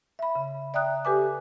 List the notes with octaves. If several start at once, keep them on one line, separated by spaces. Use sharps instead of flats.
E5 B5
C#3
D5 E5 G5 A#5 D#6 F#6
G4 A4 B4 G#5 D6